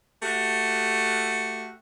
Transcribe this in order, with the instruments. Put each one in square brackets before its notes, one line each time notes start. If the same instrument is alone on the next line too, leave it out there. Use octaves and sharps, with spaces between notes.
[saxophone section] A3 F#4 G4